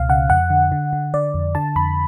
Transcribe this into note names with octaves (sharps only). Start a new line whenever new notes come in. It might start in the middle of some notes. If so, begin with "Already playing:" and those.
Already playing: C#2 B2 F5
C#3 F#5
F2 F#5
D3
D3
D3
D3 D5
F2
D3 A5
F2 B5